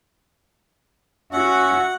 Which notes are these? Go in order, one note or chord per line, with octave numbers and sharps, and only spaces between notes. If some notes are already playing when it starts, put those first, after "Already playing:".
C#4 F#4 E5 F#5